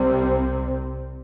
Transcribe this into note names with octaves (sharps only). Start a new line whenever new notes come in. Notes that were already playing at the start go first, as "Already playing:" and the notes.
Already playing: C2 C3 G3 C4